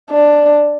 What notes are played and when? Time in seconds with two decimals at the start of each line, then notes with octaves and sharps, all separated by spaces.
0.11 D4